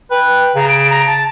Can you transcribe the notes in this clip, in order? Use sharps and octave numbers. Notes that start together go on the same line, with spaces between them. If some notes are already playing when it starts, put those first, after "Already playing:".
B4 G5
C#3 A#5
D7
A#5
A5